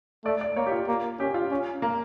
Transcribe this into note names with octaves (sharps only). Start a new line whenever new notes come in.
A3 D5
D5
A#3 C#5
G4
F4
A#3
C#4 G4
F4
C#4
A#3